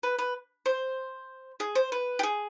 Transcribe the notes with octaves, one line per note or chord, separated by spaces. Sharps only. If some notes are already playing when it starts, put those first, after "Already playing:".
B4
B4
C5
G#4
C5
B4
G4
G#4